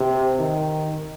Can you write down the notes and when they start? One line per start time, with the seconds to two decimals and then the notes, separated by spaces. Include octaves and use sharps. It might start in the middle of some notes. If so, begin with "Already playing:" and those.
Already playing: C3
0.40 D#3